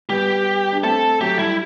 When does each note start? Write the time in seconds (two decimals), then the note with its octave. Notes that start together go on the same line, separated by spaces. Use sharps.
0.10 G3 B3 G4
0.72 D4
0.83 A3 C4 A4
1.21 F#3 A3 G4
1.39 G3 E4